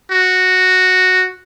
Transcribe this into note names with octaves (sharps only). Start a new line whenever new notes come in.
F#4